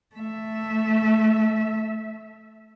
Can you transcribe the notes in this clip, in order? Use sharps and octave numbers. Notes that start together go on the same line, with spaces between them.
A3 E5